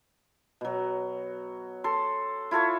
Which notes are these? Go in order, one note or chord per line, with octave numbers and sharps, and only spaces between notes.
B2 F#3
A4 C6
E4 F4 A4 C#5